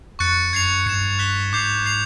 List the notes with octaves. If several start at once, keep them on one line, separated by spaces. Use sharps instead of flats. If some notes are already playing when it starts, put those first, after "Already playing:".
F2 C#6 F#6 A6 C#7
F#2 G#6 C7 F7
G2 G#6 C#7 E7
F#6 B6 E7 G7
G#2 D6 G6 C7 F7
G#6 C7 F7